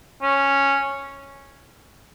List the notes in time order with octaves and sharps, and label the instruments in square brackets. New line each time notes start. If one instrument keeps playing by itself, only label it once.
[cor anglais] C#4